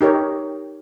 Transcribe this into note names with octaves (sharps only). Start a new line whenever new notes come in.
D#4 G4 A#4 C#5